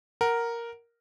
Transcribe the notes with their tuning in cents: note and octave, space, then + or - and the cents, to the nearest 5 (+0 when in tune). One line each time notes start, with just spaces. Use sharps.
A#4 +0 F#5 +10